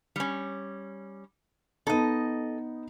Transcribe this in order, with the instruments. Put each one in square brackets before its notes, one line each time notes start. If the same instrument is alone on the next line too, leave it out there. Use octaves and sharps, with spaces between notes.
[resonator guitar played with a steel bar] G3 C#4
[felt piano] B3 D#4 [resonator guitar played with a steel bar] A4 D#5